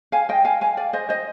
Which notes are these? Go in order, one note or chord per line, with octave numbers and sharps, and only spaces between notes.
F5 G#5
D#5 G5
F5 G#5
F5 G#5
D5 F5
C5 D#5
C5 D#5